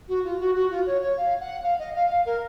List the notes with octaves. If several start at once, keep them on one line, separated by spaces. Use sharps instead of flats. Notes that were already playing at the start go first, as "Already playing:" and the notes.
F#4
F4
F#4
F#4
F4
C#5
C#5
F5
F#5
F5
D#5
F5
F5
A#4